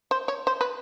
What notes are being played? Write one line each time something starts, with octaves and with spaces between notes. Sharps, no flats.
C5
C#5
C5
B4